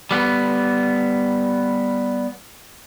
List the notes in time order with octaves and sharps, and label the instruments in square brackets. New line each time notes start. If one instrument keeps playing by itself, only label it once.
[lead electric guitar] G3 B3